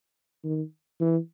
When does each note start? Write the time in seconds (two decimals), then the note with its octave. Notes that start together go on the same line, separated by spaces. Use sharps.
0.45 D#3
1.00 E3